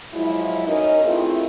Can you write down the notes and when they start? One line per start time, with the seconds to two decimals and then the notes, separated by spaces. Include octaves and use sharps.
0.14 F3 F#3 G#3 E4
0.66 C#4 D#4 F#4 A#4 D#5
1.04 A3 C4 E4 F4 G#4 A#4